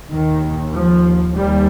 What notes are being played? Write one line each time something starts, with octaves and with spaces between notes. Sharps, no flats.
D#2 D#3
F3
D#2 G3